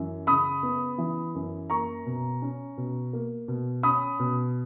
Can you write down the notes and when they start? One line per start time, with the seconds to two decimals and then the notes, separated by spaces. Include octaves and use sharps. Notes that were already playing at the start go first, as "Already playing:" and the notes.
Already playing: F#2 E3
0.27 C#3 B5 D#6
0.63 B3
0.98 E3
1.35 F#2
1.70 A#3 A#5 C#6
2.06 B2
2.42 C#4
2.77 B2
3.13 A#3
3.48 B2
3.83 C#4 B5 D#6
4.19 B2